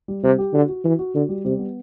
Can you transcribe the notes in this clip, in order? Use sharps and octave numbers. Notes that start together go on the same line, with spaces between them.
G3
C3 G3
G4
D3 F#4
F#4
E3 F#4
F#4
D3 F#4
G3
C3 G3
B3